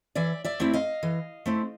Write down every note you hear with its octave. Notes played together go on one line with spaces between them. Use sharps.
E3 D5 E5
D5 E5
A3 C4 E4
D#5 F5
E3
A3 C4 E4